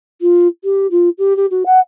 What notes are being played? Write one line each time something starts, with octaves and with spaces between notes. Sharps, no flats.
F4
G4
F4
G4
G4
F#4
F#5